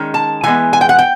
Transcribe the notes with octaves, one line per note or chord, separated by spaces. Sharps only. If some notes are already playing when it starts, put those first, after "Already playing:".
Already playing: D#3 G#3 C#4
A5
E3 G#3 B3 G#5
G#5
G5
F#5
G5